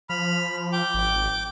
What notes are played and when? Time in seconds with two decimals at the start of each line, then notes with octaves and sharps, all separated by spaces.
0.09 F3 B5 F6
0.72 G5 D6
0.94 G#1